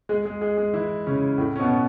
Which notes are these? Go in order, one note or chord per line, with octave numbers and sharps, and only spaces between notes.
G#3 G#4
G#3 G#4
G#3 G#4
G#3 G#4
E3 E4
C#3 C#4
A2 A3
C#4
B2 B3